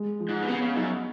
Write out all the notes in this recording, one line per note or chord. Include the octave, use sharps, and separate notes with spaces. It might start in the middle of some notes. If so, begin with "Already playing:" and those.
Already playing: G#3
F3
G#2
B2
C#3 B3
C#3
F#2 D#4